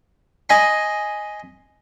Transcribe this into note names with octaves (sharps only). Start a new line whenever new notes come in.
D#5 G#5 B5 C6